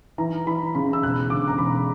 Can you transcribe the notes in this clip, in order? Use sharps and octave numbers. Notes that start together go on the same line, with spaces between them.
E3 A#5
E3 B5
C#3 B5
E6
E1 F#6
D3 D6
A#5
E1 B5